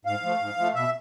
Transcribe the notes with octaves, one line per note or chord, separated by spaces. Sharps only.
G#2 F5
F3 A3
G#2
F3 A3
B2 E5